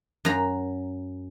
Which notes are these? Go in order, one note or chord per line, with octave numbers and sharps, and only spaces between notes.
F#2 A#5